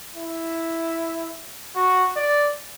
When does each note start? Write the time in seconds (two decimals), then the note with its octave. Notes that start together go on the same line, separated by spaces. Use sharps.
0.16 E4
1.75 F#4
2.16 D5